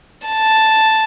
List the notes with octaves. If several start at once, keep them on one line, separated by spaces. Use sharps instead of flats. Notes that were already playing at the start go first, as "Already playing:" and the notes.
A5